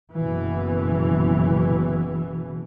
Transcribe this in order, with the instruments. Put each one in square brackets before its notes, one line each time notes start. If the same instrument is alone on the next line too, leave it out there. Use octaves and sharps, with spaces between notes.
[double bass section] F#1 B2 E3